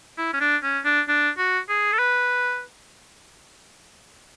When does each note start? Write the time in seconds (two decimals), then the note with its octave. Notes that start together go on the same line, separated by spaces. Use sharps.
0.18 E4
0.33 C#4
0.41 D4
0.63 C#4
0.85 D4
1.09 D4
1.38 F#4
1.69 G#4
1.92 A4
1.99 B4